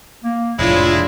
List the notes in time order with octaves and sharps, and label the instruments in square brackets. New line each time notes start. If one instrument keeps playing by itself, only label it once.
[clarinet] A#3
[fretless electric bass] F1 A2 [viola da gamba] F3 D4 F4 [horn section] G#3 E4 [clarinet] C#5